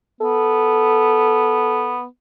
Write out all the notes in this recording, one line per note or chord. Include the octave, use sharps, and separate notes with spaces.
B3 A4